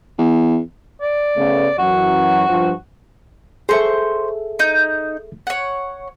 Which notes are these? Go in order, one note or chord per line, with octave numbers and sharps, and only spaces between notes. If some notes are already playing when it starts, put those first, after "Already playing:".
E2
D5
C#3 A3 B3
F#2 E3 F#3 F#4
G2 F3
G#4 A4 C5 E5 C#6
D#4 G6
C#5 F#5